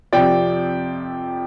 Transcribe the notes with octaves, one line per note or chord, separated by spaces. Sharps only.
F2 C3 F3 D5 G5